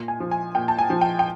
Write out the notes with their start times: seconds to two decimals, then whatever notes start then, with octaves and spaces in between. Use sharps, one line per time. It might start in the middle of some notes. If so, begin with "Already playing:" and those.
Already playing: A#2
0.08 G#5
0.20 F3
0.31 G#5
0.55 A#2 G5
0.68 A5
0.79 G#5
0.90 F3
1.01 G5
1.19 G5